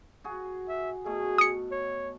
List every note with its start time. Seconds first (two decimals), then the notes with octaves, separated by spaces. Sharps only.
0.24 F#4 G#4
0.69 E5
1.05 B2 A3 G#4
1.38 D#6 C#7
1.72 C#5